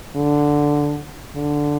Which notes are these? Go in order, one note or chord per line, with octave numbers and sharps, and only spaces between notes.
D3
D3